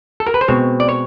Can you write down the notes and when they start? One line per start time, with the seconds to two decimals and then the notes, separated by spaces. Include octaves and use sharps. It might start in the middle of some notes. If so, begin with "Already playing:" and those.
0.20 A4
0.27 A#4
0.34 B4
0.41 C5
0.48 B2 G#3 C4 C#5
0.80 D5
0.89 C#5